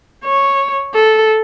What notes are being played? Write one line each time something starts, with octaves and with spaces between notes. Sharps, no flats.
C#5
A4